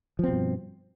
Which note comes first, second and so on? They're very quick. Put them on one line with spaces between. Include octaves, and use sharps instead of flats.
F3 C4 B2 G2